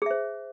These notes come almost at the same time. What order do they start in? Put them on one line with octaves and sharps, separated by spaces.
G#4 E5 C5